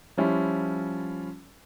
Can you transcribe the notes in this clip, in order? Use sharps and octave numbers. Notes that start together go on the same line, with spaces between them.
F3 G3 C#4 E4 F4